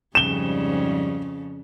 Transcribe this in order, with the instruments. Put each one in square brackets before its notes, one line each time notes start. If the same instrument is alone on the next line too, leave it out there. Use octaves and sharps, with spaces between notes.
[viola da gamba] F2 C#3 [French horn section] G#2 G3 [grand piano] E7 G7